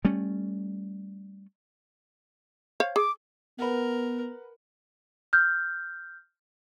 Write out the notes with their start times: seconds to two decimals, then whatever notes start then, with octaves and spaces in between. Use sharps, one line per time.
0.05 G3 A3 C#4
2.80 C5 C#5 F5
2.96 G#4 D6
3.59 B3 A#4 B4 F#5
5.33 F6 G6